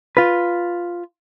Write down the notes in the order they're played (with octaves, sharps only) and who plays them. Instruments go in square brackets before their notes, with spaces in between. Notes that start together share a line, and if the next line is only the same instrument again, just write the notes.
[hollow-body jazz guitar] F4 B4